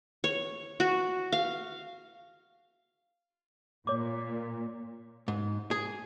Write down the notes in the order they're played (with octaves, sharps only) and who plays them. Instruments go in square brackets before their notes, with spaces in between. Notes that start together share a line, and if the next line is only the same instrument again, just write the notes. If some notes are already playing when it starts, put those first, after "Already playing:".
[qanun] C#5
F#4
F5
[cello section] A#2 [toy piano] C#5 D6
[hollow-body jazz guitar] G#2
G#4